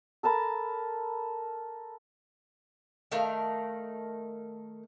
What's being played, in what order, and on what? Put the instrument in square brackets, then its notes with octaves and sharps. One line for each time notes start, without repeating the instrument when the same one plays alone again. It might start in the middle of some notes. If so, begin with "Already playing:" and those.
[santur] A4 A#4 A5 B5
[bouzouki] D#3 A3 A#4 F5